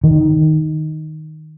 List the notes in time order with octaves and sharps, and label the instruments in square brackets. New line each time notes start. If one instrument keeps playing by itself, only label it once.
[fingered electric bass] D#3